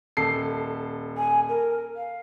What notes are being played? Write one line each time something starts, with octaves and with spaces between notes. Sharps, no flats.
D#1 A4 C7
G#5
A#4
F5